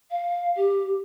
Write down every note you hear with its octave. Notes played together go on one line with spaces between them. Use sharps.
F5
G4